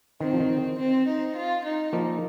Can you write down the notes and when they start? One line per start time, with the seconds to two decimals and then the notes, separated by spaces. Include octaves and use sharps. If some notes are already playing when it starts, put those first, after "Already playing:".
0.20 D#3 C4
0.33 F3
0.40 D#3
0.78 C4
1.07 D#4
1.36 F4
1.64 D#4
1.93 F3 A#3